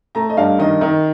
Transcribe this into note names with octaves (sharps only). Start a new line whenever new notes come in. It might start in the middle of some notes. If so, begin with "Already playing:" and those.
A3 A#5
D#5
G2 F5
D#3 D#5
D#3